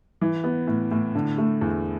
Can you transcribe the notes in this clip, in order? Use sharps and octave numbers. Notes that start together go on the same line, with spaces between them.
E3
B3
A2
A2
D3
A3
E2